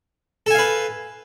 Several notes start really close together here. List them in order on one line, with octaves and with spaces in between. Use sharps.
A4 G#5 F5 B4